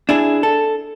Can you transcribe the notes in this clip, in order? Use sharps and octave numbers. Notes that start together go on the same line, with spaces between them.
D4 E4 G#4
A4